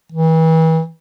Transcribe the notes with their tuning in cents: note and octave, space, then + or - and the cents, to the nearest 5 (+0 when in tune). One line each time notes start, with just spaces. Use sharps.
E3 -35